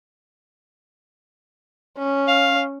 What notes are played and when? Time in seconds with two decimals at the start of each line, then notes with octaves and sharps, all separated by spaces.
1.98 C#4
2.28 F5